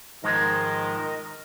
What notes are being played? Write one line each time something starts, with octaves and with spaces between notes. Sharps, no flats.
G#2 D#3 F3 G#3 A#4 D#5